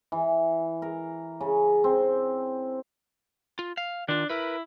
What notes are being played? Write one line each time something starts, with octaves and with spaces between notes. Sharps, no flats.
E3
A#4
C#3
C4
F4
F5
D#3 D4 F4
E4 A#4 B4